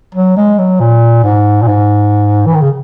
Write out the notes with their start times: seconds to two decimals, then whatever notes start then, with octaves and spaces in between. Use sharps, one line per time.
0.15 F#3
0.37 G#3
0.58 F#3
0.80 A#2
1.24 G#2
1.62 A#2
1.68 G#2
2.46 E3
2.54 D#3
2.61 C#3